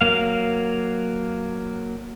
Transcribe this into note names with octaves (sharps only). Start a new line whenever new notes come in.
F#3 A#3 F5